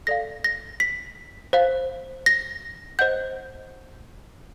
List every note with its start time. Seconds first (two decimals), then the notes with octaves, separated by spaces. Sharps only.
0.07 A4 D5 F5 A#6
0.44 A#6
0.80 B6
1.53 C5 F5
2.26 A#6
2.99 C5 D#5 F#5 G6